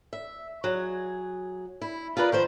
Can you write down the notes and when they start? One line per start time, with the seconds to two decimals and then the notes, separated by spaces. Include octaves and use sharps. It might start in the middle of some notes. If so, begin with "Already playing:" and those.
0.13 E5
0.64 F#3 G#4
1.82 E4
2.17 F4 G#4 A#4 B4 D5
2.32 D#3 F3 C5